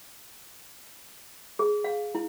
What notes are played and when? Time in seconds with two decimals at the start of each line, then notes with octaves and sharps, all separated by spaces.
1.59 G#4
1.84 F5
2.15 E4